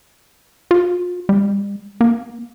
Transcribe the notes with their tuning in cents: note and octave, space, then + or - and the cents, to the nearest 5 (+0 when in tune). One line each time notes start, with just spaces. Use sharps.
F4 +35
G3 +40
A#3 +40